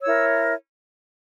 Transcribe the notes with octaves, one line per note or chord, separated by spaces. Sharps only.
E4 A#4 C#5 E6